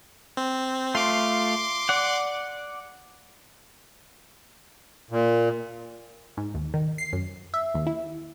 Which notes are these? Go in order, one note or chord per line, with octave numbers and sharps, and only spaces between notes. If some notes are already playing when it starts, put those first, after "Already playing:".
C4
A3 F4 C6 D6
D5 F#5
A#2
G#2
D#2
D#3
C7
F#2
E5
D#2
E4